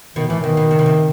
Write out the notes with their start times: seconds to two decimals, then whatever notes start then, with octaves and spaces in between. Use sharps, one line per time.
0.16 B2 D#3
0.27 A2 E3
0.39 B2 D#3
0.57 B2
0.71 C3
0.79 B2
0.86 C3